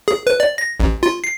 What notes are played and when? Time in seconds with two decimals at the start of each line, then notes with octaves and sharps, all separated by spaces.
0.08 G#4
0.27 B4
0.40 D5
0.58 A#6
0.80 A1
1.03 F4
1.24 C7